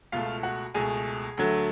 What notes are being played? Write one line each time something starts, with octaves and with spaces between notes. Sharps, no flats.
C#2 B2 A3 F4 F5
F#4 F#5
C#2 B2 A3 G#4 G#5
D2 D3 F#3 A3